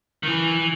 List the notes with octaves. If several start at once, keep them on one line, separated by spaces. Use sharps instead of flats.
D#3
E3